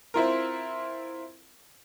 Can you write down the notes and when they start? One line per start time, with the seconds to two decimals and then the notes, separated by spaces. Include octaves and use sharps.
0.14 C4 E4 F4 A#4